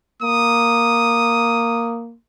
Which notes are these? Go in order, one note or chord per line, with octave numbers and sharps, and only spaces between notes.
A#3 D#6